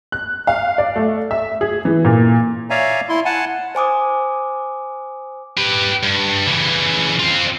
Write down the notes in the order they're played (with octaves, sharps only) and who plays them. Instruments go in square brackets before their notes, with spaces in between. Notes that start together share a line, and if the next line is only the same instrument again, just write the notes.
[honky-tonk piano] F#6
F5
D5
A3
E5
G#4
E3
A#2
[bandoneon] C#5 D5 E5 F5 G#5 A#5
E4 C6
F#5 G#5 A5
[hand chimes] C5 G#5 D6 D#6
[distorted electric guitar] G4 B4
G2
C#3 E3
C4 F4